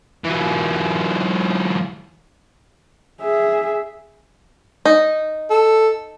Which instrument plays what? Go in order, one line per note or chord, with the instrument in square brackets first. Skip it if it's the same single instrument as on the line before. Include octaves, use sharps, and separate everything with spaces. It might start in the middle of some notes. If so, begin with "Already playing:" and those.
[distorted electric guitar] E3 F#3
[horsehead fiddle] G#4 E5
[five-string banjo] D#4
[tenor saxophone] A4